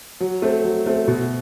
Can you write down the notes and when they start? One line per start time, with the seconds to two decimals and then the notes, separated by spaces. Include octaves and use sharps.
0.21 F#3
0.42 A3 C4
0.64 F#3
0.86 A3 C4
1.08 B2